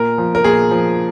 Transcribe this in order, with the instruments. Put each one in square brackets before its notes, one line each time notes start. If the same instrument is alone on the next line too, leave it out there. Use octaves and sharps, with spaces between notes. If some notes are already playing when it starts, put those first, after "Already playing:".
Already playing: [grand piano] A#2 A#4
F3
A#4
A#2 G#4
F3